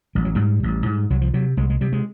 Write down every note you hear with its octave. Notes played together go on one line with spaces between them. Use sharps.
A1 G3
F#3
G#2 G3
A1
G#2
C2 F#3
F3
C3 F#3
C2 G#3
G#3
C3 G3
G#3